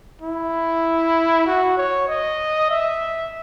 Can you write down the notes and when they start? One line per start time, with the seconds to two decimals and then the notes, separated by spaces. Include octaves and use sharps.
0.22 E4
1.46 F#4
1.77 C#5
2.08 D#5
2.70 E5